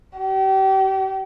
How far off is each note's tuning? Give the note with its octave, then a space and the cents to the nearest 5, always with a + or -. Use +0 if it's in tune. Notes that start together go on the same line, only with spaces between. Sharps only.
G4 -35